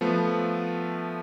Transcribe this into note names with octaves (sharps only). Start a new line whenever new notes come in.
F3 A3 B3